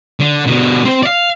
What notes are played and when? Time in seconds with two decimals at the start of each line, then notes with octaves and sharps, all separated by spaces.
0.20 D3
0.47 B2 D3
0.85 C4 C5
1.03 D5 F5